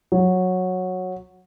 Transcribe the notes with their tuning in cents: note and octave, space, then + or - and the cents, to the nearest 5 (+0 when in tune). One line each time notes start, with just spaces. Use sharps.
F#3 -10